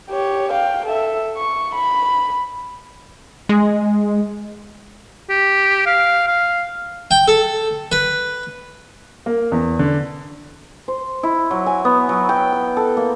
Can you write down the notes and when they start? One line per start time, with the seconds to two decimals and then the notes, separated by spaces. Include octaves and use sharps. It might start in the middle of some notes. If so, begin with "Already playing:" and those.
0.10 G4 C#5
0.52 F5 G5
0.86 A4 E5
1.37 C#6
1.75 B5
3.49 G#3
5.29 G4
5.86 F5
6.27 F5
7.11 G5
7.28 A4
7.92 B4
9.26 A#3
9.52 E2
9.79 D3
10.88 C5
11.23 E4
11.51 F#3
11.66 G#5
11.85 B3
12.09 F#3
12.29 G5
12.53 G5
12.77 A4
12.97 A#3